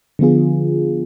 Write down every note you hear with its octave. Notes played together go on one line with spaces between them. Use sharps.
D3 F3 B3 F4 G#4